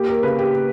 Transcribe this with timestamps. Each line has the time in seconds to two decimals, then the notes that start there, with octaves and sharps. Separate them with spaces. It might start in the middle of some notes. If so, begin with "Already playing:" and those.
Already playing: A#3 G4
0.08 A#4
0.23 C#3 B4
0.39 G4